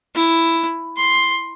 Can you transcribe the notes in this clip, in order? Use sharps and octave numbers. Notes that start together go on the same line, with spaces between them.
E4
C6